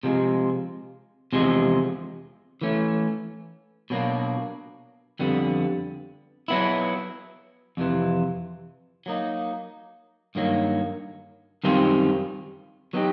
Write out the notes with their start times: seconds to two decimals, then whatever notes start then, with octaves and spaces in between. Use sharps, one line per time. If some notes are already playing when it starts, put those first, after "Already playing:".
0.03 C3 F3 G#3
1.33 E2 C3 F3 G#3
2.61 E3 A3 C#4
3.90 B2 F#3 A#3 D4
5.19 F2 D3 G3 B3
6.48 F#3 B3 E4
7.77 F2 C3 E3
9.06 F#3 A#3 D#4
10.35 G2 D#3 F#3 A#3
11.64 F#2 D#3 G3 C4 F4
12.93 F#3 B3 D#4 G4